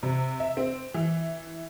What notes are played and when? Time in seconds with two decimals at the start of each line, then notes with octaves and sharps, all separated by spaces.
0.03 C3
0.40 E5
0.57 C4
0.94 E3